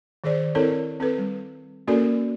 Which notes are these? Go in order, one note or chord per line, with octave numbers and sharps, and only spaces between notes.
D#3 G#4 C5 D5
C4 E4 A4 A#4 C#5
C4 A4 B4
G3
A#3 C#4 F#4 A4 A#4 D5